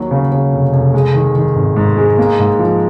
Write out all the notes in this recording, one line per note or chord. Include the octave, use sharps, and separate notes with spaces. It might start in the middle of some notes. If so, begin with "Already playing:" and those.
Already playing: D#2 F#3
C#3
C#3
F1
F1
G#3
D#3
D#3
G#1
G#2
G#3
A#3
G#2
F3